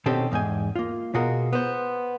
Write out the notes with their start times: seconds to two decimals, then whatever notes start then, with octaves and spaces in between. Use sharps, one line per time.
0.06 B2 D#3 C4 C#4 G4 A4
0.32 E2 G#2 G5 G#5
0.76 A#3 F4
1.14 B2 F4 F#4 G#4 A#4
1.53 B3 C5